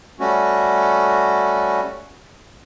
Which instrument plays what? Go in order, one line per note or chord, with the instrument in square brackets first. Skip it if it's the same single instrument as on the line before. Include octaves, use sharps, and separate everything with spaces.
[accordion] G3 A3 C#4 F#4